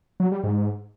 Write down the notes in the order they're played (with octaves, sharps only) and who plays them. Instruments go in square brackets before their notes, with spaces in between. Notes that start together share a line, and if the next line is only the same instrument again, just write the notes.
[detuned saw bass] F#3
G3
G#2